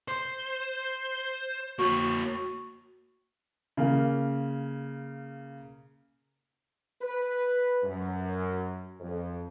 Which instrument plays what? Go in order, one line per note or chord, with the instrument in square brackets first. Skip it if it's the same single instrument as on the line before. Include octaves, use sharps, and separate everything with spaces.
[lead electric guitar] C5
[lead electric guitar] A#3 C#5 [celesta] F#4 C#6
[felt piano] C#3 A#3
[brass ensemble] B4
F#2
F2